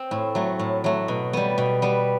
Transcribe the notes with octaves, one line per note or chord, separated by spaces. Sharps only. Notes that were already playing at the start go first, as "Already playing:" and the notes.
Already playing: C4
A2
F#3 A3
A2
F#3 A3
B2
G3 B3
B2
G3 B3